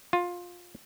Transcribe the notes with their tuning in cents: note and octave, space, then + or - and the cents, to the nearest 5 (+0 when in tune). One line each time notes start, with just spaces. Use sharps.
F4 +15